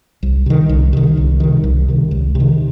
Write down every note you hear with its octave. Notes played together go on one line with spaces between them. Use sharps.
C2
C3 D#3
C2
C3 D#3
C2
C3 D#3
C2
C3 D#3
C#2
C3 D#3